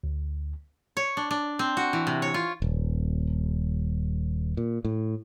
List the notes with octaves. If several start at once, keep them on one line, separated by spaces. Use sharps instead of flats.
D2
C#5
D4
D4
C4
F#4
E3
C3
C#5
F4
D#1
A#2
A2